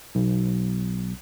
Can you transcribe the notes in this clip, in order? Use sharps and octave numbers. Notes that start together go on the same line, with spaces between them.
B1